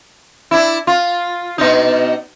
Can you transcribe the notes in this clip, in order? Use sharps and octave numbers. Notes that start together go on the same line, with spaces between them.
D4 E4
F4
B2 D4 D#4